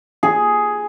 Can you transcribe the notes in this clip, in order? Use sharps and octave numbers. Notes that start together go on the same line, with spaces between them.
G#4